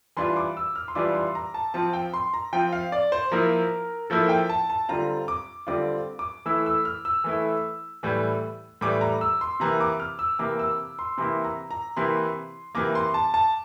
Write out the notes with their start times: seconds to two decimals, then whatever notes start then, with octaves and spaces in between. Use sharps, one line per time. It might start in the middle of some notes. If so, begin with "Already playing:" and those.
0.17 E3 G3 D4 F4 C6
0.36 D6
0.57 E6
0.76 F6
0.88 C6
0.95 E3 G3 D4 F4 D6
1.15 C6
1.35 A#5
1.54 A5
1.74 F3 C4 F4 A5
1.93 G5
2.14 C6
2.34 A#5
2.53 F3 C4 F4 G5
2.73 F5
2.92 D5
3.12 C5
3.32 F3 A#3 E4 A#4
4.10 F3 A#3 E4 A4
4.29 G5
4.49 A5
4.70 A5
4.89 D3 G3 C4 F4 A#5
5.28 D6
5.67 D3 G3 C4 F4 D6
6.19 D6
6.46 E3 A3 E4 E6
6.66 E6
6.85 F6
7.05 E6
7.24 E3 A3 E4
8.03 A2 E3 G3
8.81 A2 E3 G3 D6
9.01 A#5
9.21 E6
9.41 C6
9.60 C3 E3 A#3 A#5
9.80 D6
10.00 F6
10.19 E6
10.39 C3 E3 A#3 D6
10.59 E6
10.99 C6
11.18 C3 E3 A#3 E4 C6
11.44 A#5
11.71 A#5
11.97 C3 E3 A#3 E4 C6
12.75 C3 E3 A#3 D6
12.95 C6
13.14 A5
13.34 A5